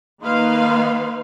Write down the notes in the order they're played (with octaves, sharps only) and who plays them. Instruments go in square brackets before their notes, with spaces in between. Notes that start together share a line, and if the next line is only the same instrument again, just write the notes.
[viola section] D#3 A#3 D#4 B4 F5 C6